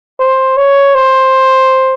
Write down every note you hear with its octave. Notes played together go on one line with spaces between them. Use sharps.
C5
C#5
C5